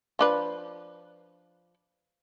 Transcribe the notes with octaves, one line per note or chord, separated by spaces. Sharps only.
F3 D4 B4